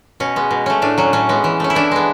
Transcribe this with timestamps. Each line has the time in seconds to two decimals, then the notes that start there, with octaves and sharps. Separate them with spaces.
0.20 B2 C#4
0.36 G#3 B3
0.51 B2
0.66 A3 C#4
0.82 A2 D4
0.98 F#3 C#4
1.13 A2 C#4
1.29 G#3 B3
1.44 E3
1.60 A3 C#4
1.70 E4
1.75 E3 D4
1.91 G#3 B3